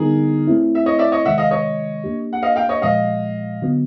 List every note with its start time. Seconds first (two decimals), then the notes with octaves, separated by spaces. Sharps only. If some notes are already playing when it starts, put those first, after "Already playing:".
Already playing: D3 G3 B3 D#4 G#4 A#4
0.47 A3 C4 E4
0.75 E5
0.86 C#5 D#5
0.99 D5 E5
1.12 C#5 D#5
1.25 C3 D#3 G#3 E5 F#5
1.38 D#5 F5
1.51 C#5 D#5
2.04 A#3 D4 G4
2.33 F#5
2.43 D#5 F5
2.56 F5 G5
2.69 C#5 D#5
2.82 A#2 F3 G#3 D#5 F5
3.62 D3 F#3 B3